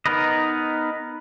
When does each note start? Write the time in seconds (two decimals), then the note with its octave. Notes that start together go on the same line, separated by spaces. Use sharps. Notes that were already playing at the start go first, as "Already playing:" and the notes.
0.06 B3 D#4 A#4 B4 D#5